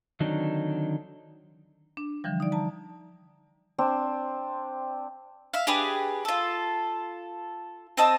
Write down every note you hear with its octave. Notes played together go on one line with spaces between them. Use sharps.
D3 D#3 F#3 C4 D4 D#4
D4
D3 E3 F3 G3
D#4 D5
A5 A#5
C4 D4
E5 F5
D4 G4 G#4 B4
F4 A4
C4 D#5 A5 E6